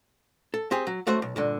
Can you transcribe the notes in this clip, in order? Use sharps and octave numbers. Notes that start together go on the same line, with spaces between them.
A4
C4 G4 G#4
F#3
F#2 A3 F#4 C5 E5
B1
G2 A#2 D3